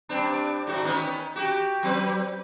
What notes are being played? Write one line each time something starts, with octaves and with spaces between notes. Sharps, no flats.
G2 C4 D4
G#2 F#4
D#3 B3 C#4
F#4 G4
F#3 C4 B4